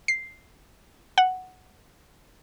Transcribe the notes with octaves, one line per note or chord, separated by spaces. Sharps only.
C7
F#5